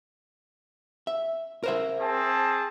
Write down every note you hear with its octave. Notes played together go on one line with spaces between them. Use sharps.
E5
A#4 C5 E5
C4 G#4 A5